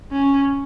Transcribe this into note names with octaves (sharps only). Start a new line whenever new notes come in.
C#4